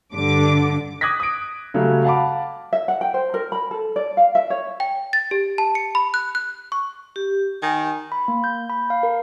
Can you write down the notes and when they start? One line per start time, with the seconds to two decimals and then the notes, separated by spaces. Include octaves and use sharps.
0.14 G2 D3 D6
1.01 D6 D#6 F#6 G#6 A#6 B6
1.20 D#6 D7
1.74 C#3 F#3 G3 A3
2.04 F5 F#5 A5 B5 D6
2.73 E5
2.88 F#5
3.01 G5
3.14 C5
3.34 A#4
3.52 B5
3.71 A4
3.96 D5
4.17 F5
4.35 E5
4.50 C#5
4.80 G5
5.13 A6
5.31 G4
5.58 A5
5.75 C#7
5.95 B5
6.14 F#6
6.35 F#6
6.72 C#6
7.16 G4
7.62 D#3 G#5
8.12 B5
8.28 A#3
8.44 G6
8.70 B5
8.90 F5
9.03 A#4